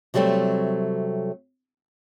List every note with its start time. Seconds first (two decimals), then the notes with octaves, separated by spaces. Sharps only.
0.14 C3 F#3 G3 A3 C4